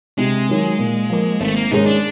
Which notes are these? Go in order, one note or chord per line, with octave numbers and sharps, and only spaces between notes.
C3 G#3
D#3 F#3
A#2
F3 A#3
G#1 A3
A#3
G#2 D#3 G#3 C#4 D#4
D4